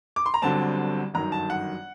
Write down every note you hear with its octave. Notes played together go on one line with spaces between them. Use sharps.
D6
C6
A#5
G1 G2 D3 F#3 C4 A5
G1 F#2 D#3 F#3 A#5
A5
F#5